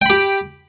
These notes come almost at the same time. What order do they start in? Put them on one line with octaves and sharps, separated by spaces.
G5 B5 G4